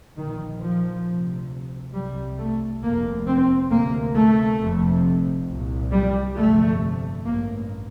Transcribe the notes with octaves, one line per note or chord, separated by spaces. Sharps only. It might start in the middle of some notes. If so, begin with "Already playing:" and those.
A#1 A#2 D#3
F3
D2 C3
C2 C3 G3
A3
F1 D#2 A#3
C4
D2 C3 A#3
A3
F1 F2 C3
C2 A#2
G3
G1 F2 C3 A3
A1 G2 A#3